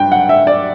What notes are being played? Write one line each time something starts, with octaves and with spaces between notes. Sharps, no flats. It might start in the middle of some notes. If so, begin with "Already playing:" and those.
Already playing: G2 G5
F#5
E5
D5